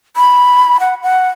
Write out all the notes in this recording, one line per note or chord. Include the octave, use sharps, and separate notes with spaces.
B5
F#5
F#5